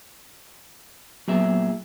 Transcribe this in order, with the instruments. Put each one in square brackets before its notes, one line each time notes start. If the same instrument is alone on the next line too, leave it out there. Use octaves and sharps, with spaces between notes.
[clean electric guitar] A#2 G#4 E5 [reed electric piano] F#3 B3